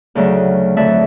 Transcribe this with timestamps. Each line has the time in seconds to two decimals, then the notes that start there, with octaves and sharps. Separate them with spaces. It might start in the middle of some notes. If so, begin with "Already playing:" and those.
0.15 D2 C#3 F#3 A3
0.76 F2 D3 F#3 A3 D5 E5